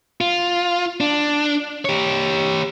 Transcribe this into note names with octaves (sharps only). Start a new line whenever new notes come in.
F4
D4
G4 C#5